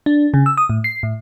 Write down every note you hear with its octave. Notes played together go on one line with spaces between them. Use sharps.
D4
C#3
E6
D#6
A2
C7
A2